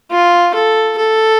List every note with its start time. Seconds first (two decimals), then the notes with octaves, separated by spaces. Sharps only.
0.11 F4
0.54 A4
0.98 A4